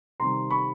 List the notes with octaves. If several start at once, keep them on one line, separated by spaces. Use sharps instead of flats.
C3 D#3 G3 A#5 C6
B5 C#6